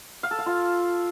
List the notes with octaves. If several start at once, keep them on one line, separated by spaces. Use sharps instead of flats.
F5
A4
F5
F4